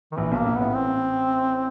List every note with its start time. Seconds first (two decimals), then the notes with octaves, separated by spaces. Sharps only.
0.12 D#3
0.17 A#1 A#2 E3
0.32 B1 B2 A#3
0.45 A#1 A#2
0.56 A1 A2 B3
0.74 C4